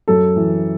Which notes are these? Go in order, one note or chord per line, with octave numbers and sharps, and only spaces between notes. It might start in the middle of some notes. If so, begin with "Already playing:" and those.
F#2 A4
E3